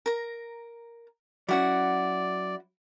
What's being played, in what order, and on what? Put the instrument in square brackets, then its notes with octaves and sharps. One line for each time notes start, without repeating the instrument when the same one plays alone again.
[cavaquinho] A#4 A#5
[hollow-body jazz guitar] F#3 C#4 [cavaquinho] E4 F#4 F#5 [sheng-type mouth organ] D5